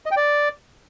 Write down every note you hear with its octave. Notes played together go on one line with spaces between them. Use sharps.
D#5
G5
D5